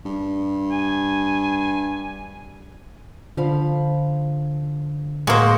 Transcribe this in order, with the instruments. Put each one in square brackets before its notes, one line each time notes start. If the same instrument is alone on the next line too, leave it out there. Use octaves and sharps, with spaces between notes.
[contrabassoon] G2
[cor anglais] G#5
[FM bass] D3 [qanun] F3 F5 B5
[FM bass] A2 [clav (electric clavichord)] G#3 A#3 A#4 [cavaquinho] F#4 C5